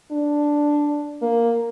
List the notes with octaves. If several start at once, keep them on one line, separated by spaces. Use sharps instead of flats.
D4
A#3